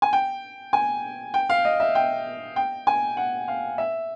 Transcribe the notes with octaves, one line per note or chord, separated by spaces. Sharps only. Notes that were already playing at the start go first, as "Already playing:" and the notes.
G#5
G5
G#5
G5
F5
D#5
E5
G5
G5
G#5
F#5
F5
E5